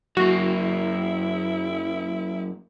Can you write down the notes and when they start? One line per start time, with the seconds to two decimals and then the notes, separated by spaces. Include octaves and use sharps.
0.17 F#2 A#3 E4 F#4